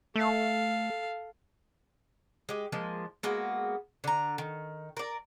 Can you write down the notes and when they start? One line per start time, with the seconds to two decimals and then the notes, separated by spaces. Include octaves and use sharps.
0.16 A3 A4 F5
2.49 G#3 G4
2.72 F3 G#3 A#3
3.23 G#3 A#3 B3 F#4
4.04 D3 A#5
4.38 D#3
4.97 A#4 D5